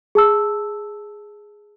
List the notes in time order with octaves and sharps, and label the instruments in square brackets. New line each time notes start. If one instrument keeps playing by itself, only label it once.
[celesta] G#4 A5 E6